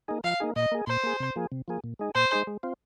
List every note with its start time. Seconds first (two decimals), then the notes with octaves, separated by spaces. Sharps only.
0.08 A#3 D#4 G#4
0.24 F3 F5
0.40 A#3 D#4 G#4
0.56 A#2 D#5
0.72 A#3 G#4
0.87 A#2 C5
1.03 A#3 G#4
1.20 C3
1.36 F3 A#3 G#4
1.52 C3
1.68 F3 A#3 G#4
1.84 A#2
1.99 G#3 D#4 G#4
2.15 A#2 C5
2.32 G#3 D#4 G#4
2.47 G#3
2.63 C4 F4